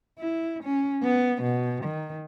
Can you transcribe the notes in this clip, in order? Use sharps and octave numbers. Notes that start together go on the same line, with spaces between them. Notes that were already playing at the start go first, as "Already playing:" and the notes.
E4
C#4
B3
B2
D#3